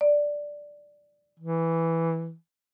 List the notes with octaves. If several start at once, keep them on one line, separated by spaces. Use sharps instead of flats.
D5
E3